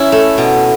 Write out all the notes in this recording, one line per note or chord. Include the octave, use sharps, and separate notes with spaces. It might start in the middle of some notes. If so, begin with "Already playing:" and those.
Already playing: C#4 E4
A3
B2